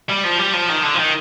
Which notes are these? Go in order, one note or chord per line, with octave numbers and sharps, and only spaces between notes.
G3
F3
G3
F3
D#3
D3
F3
D#3